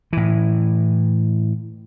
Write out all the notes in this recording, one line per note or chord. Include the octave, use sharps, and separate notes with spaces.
A2 E3